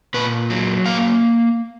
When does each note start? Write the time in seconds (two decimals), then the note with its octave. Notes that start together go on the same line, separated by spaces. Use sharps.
0.14 A#2 B4
0.50 F#3
0.86 A#3 F5